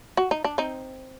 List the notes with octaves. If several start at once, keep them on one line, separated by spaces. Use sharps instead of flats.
F#4
D#4
D4
C4 D#4